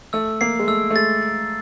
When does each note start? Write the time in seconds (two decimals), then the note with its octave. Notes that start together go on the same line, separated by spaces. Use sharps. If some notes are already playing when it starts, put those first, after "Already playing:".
0.13 A3 E6
0.41 A#3 C7
0.59 G#3
0.68 A3 E6
0.90 A3
0.95 G#3 A6
1.23 A6